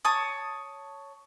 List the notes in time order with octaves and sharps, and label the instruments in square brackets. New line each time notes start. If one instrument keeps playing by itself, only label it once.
[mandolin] C#5 A5 D#6